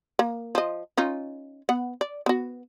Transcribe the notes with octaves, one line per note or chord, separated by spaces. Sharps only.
A#3
F3 D#5
C#4 D#4 F4
B3 F#5
D5
B3 F#4